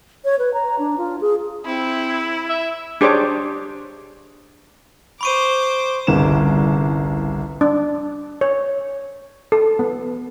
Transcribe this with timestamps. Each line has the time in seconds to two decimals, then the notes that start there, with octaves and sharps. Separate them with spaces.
0.25 C#5
0.39 B4
0.54 A#5
0.78 D4
0.98 F4
1.21 G#4
1.65 C4 E4
2.49 E5
3.01 D4 G4 G#4 C5 C#5 D6
5.21 C5 B5 C#6 D6 D#7
6.07 G1 C2 C#3 E7
7.61 D4
8.41 C#5
9.52 A4
9.79 B3